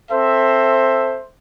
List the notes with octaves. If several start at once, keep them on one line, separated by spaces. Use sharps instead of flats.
C4 A4 C5 E5